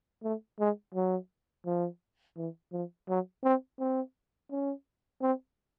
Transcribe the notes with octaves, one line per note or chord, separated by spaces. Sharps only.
A3
G#3
F#3
F3
E3
F3
F#3
C4
C4
C#4
C4